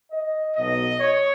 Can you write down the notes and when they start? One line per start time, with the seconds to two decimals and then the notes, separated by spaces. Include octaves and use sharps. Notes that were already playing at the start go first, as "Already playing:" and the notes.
0.11 D#5
0.56 B1 B2 F#3 D#5
1.01 C#5